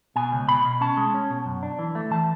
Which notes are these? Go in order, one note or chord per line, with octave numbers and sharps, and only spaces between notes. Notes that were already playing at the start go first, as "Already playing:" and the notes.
B2 G#5
C#2
B2 B5
B2
C#4 A5
G#3
C#4
B2
F#2
D4
E3
A3
E3 A5